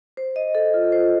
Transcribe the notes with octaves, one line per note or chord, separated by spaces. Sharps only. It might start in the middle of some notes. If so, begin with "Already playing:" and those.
C5
D#5
A4
F4
C5